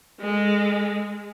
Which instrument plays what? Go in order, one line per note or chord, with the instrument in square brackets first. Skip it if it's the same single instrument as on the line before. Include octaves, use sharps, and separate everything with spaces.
[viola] G#3 A4